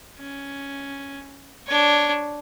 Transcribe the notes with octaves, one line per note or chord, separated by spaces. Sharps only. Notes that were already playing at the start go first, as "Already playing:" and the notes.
C#4
D4 C#5